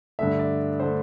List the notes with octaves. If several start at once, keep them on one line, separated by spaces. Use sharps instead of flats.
G2 D3 A3 E5
D5
D3 A3 C5